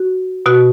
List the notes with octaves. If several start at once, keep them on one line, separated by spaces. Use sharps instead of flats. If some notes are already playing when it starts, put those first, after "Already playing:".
Already playing: F#4
B2 F#4